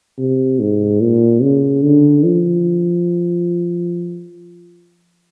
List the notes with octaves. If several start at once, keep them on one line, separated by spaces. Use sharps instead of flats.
C3
G#2
A#2
C#3
D3
F3